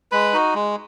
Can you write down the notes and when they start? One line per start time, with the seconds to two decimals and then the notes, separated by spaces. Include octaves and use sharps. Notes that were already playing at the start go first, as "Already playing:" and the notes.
0.12 G#3 B4 B5
0.33 D#4 F#4
0.54 G#3